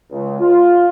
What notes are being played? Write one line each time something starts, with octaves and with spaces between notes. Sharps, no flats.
C#2
F4